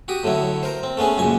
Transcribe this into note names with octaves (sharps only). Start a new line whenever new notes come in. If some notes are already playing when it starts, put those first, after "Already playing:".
F#4 G4 D#6
A2 D3 F#3 E4
A#4 C5
C4
A3 B3 C#4 G#4
C#2 F#2 A#2 G#5